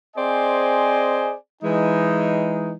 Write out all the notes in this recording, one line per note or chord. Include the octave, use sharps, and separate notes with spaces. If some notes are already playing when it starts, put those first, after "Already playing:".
C4 G#4 C5 D5 D#5 G#5
E3 G#3 D#4